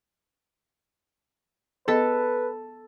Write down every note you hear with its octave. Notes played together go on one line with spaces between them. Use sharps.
B3 A4 B4 D#5